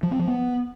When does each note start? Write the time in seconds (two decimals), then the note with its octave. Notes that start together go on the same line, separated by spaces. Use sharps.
0.03 F3
0.11 C4
0.19 F3
0.27 B3